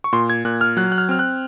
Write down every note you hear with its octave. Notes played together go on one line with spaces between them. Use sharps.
C#6
A#2 C6
G#6
A#2 F#6
F6
F#3 F#6
F#6
F6
C4 F6
F#6